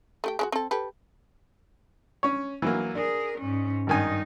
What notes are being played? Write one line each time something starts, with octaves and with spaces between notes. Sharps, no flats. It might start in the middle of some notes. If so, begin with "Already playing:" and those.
A3 G4 G5
G#3 C#4 F#4
C4 A4
G4 A4 B4
C#4 C#5
E3 F#3 A#3
D4 G#4 A#4
G#2 C#4
G#1 G2 D#3 D#4 G#5